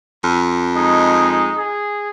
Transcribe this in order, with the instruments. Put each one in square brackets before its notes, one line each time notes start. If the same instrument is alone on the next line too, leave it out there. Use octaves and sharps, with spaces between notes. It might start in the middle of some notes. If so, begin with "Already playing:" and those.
[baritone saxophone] F2
[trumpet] G#3 [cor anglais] D#4
[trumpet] G#4